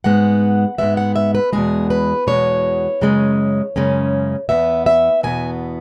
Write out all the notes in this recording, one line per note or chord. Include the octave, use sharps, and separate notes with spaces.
G#2 G#3 B3 F#5
G#2 G#3 B3 E5
F#5
E5
B4
E2 B2 G#3 G#4
B4
E2 B2 G#3 C#5
F#2 C#3 G#3 C#4
F#2 C#3 G#3 C#4
E2 B2 B3 E5
E5
E2 B2 B3 G#5